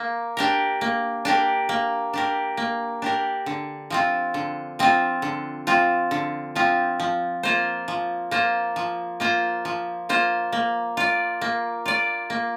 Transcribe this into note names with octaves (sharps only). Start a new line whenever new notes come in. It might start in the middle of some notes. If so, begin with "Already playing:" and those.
Already playing: A#3
D4 G4 A#4
A#3
D4 G4 A#4
A#3
D4 G4 A#4
A#3
D4 G4 A#4
D3
F3 C4 F4
D3
F3 C4 F4
D3
F3 C4 F4
D3
F3 C4 F4
F3
A#3 F4 C5
F3
A#3 F4 C5
F3
A#3 F4 C5
F3
A#3 F4 C5
A#3
F4 D5
A#3
F4 D5
A#3